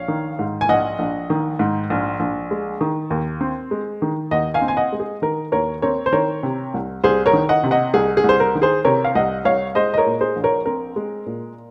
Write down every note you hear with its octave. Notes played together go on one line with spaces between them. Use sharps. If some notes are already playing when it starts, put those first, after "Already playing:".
Already playing: A#1 C#5 F5
D#3
G#2
G#5
A#1 D#5 F#5
A#1
D#3
G#2
A#1
A#1
G#3
D#3
D#2
C4
G#3
D#3
D#2 D#5 F#5
F5 G#5
C4
G#5
D#5 F#5
G#3
G#4
D#3 A#4
D#2 A#4 C#5
C4 A#4 C#5
C5
D#3 A#4 C#5
C3
C2
C2 G#4 C5
A#4 C#5
D#3
D#5 F#5
C3
D#5 F#5
C2 G#4
G#4
C2
C5
A#4
D#3
G#4 C5
C3 A#4 C#5
F5
C2 D#5 F#5
C2 C#5 F5
G#3 C5 D#5
D#5
A#4 C#5
A#2
G#4 C5
A#1
A#4 C#5
C4 A#4
G#3
A#2